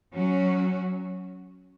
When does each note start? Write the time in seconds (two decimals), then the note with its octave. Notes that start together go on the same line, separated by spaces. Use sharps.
0.14 F#3 C#4 F#4